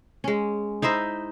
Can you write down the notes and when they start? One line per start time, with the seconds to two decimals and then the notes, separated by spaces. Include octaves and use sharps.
0.24 G#3 C#4
0.82 D#4 E4 C5 D#5